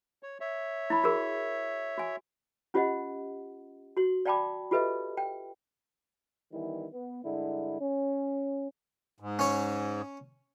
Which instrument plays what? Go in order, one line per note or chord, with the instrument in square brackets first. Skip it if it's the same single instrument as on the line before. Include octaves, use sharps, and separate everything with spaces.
[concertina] C#5
C#5 E5
[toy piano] E4 B5
F#4 G#4 A#4
F#4 G#5
C#4 F4 G4 C5 D#5 F#5
F#4 C6
D5 F5 G5 A5 B5 D6
F4 G4 A4 B4 D#5 E5
G5
[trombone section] D#3 E3 G3 B3 E4
B3
G2 D3 G#3 E4
C#4
[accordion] G#2
[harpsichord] C#4 C#5